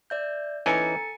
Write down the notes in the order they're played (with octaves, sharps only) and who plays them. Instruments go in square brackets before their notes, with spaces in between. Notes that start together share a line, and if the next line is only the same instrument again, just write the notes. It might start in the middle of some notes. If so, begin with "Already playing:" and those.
[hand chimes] D5 E5 G6
[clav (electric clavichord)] E3 C#4 D#4 [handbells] A4 A6 C#7 [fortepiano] G#5 [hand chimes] A#5